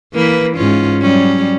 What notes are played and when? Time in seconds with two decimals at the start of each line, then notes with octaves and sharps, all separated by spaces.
0.13 E3 A#3 B4
0.57 G#2 C#4 F4
1.01 F#3 G3 C#4